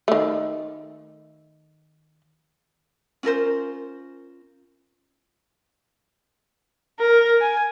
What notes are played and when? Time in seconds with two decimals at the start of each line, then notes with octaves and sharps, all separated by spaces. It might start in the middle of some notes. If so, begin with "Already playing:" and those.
0.08 D#3 A3
3.23 C#4 F4 A#4 C5
7.00 A#4
7.41 G#5